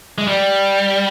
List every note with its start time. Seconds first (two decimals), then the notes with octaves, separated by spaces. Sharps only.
0.18 G#3
0.27 G3